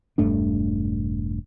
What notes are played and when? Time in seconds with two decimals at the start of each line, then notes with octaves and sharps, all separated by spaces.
0.18 E1 G2 A3 D4